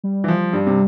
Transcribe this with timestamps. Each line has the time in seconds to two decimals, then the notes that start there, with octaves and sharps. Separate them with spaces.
0.04 G3
0.24 E3
0.28 F3
0.53 G2
0.67 C3